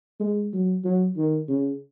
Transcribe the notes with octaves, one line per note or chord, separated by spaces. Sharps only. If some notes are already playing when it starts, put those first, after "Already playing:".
G#3
F#3
F#3
D#3
C#3